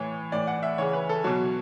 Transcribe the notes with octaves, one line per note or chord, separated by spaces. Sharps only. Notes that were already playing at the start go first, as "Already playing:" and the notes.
Already playing: A2 E3 C#5
A2 E3 D5
F#5
E5
C#3 E3 C#5
B4
A4
B2 F#3 C#5